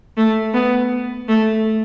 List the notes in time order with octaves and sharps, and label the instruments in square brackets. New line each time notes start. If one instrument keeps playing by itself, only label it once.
[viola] A3
B3
A3